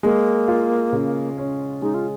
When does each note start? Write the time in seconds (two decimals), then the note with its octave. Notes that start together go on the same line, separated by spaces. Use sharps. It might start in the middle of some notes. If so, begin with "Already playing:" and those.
0.03 G#3 A#3
0.48 F4
0.93 C#3
1.37 C#4
1.82 G#3 D#4
1.94 F4